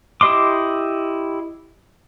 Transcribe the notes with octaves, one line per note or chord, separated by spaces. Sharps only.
E4 G4 D#5 C6 D6